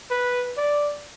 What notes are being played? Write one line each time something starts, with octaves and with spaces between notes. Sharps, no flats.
B4
D5